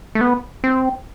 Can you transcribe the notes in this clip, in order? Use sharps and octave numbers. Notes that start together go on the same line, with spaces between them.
A3
B3
C4